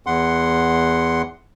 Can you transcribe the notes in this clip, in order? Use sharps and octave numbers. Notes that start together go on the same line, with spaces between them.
E2 F#5 C6